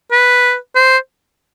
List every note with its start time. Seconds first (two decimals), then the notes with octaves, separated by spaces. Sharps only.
0.11 B4
0.75 C5